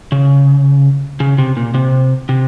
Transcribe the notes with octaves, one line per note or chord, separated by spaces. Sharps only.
C#3
C#3
C3
A#2
C3
C3